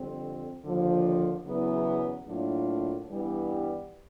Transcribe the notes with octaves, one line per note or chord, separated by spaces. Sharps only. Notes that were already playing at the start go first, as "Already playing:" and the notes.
Already playing: F2 D3 G3 C4
D#2 D3 F3
E2 C#3 F#3 B3 E4
A2 F#3 A#3 D4 F4
G2 E3 G3 B3